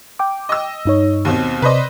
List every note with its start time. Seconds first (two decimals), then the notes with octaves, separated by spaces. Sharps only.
0.19 G5 D6
0.49 D#5 E6
0.85 G2 D#4 C#5
1.25 D#2 B2 C4
1.62 C3 B4 C5 D5 D#5